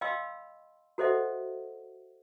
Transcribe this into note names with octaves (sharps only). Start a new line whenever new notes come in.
D#5 F5 G5 B5 C6 E6
F#4 A4 C5 D#5 E5 F#5